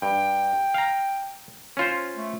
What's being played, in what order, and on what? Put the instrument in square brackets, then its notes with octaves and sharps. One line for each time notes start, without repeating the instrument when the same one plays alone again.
[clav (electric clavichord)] G2 [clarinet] G5
[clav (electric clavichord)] F5 A#5
C#4 F4 C5
[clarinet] A3